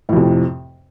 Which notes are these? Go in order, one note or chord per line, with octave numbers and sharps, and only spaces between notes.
F2 A2 C3